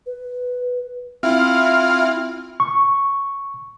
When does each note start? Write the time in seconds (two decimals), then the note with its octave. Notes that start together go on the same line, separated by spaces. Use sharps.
0.06 B4
1.23 C4 E4 F4 E5
2.60 C#6